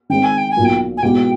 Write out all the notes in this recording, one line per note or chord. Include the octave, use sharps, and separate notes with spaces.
D#3 G#3 C4 G5
G#5
G5
G#5
B1 A#2 F#3 A#3
G5
G#5
B2 G#3 B3 E4 G4 G5